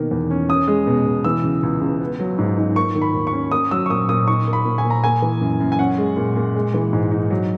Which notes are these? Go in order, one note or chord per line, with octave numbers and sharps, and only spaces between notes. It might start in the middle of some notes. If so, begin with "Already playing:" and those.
Already playing: B2 D#3 A#3
E2
C#4
C#4 D#6
G#3
B2
B2
E3 E6
C#3
C#2
C#2
B3
F#3
G#2
D#4
A#3 C#6
D#3
B5
D#2
C#6
C#4
A#3 D#6
F#3 E6
C#6
A#2 D#6
A#2 D#6
D#4 C#6
A#3
B5
A#2
G#5
A#2
A#5
A#3 G#5
E3
F#2
F#2
G#5
C#4 F#5
G#3
A#2
A#2
G#3
E3
G#2
D#4
F#3